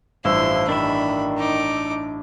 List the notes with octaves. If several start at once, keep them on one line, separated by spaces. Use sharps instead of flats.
A1 G2 F3 E4 C6 E6
D#3 D4 E5 B5
D#4 D6